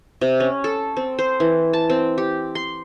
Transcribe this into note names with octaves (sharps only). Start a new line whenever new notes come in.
C3
C#4
A4
C4
C5
E3
A5
C4
G4
C6